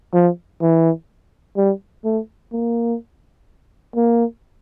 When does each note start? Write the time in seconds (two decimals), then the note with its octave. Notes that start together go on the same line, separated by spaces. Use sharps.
0.13 F3
0.62 E3
1.57 G3
2.04 A3
2.52 A#3
3.95 A#3